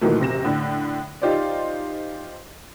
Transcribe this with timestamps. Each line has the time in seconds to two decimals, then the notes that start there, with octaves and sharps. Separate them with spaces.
0.01 A#2 D#3 E3 F#3 A3
0.20 F#1 C3 A#6 E7
0.45 A2 D3
1.22 D#4 F4 G4 C5 D5